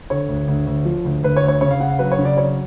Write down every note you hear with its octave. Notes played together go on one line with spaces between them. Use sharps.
D3 C#5
D2
D2
D2
F3
D2
D2 B4
C#5
D2
C#5
C#3 C#5
F5
C#3 F#5
F5
F#3 B4
C#5
C#3
D5
F#3 C#5